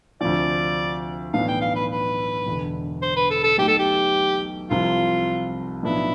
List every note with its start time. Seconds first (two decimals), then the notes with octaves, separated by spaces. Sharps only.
0.21 D2 C3 F3 D5
1.33 B1 A2 E3 B3 D4 F5
1.48 G5
1.61 F5
1.75 B4
1.90 B4
2.46 E1 E2 D3
3.02 C5
3.16 B4
3.30 A4
3.44 A4
3.58 B1 B2 A3 G4
3.68 A4
3.79 G4
4.70 C2 C3 F3 C4 F4
5.83 B1 A2 F3 B3 D4 E4